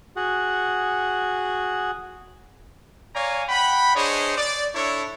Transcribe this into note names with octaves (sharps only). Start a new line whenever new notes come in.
F#4 G#4 F#5
C#5 D5 F5 G#5 A#5
F#5 G5 B5
D4 G#4 C5 C#5 D#5
D5
D4 E4 A4 C#5